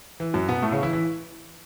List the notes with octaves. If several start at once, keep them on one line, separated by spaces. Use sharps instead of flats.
E3
F#2 F#3
B2 B3
A2 A3
C#3 C#4
E3 E4
E3 E4